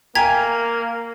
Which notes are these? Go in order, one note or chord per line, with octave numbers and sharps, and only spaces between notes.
A#3 G5 G#5 A#5 G#6 B6